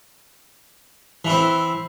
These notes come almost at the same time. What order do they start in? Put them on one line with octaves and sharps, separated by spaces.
E3 E4 C4